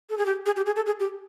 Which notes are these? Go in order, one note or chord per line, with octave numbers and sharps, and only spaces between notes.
A4
G#4
G4
G#4
G4
G#4
A4
G#4
G4